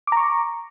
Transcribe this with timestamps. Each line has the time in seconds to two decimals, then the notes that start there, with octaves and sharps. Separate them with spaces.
0.07 D6
0.12 A#5
0.17 C#6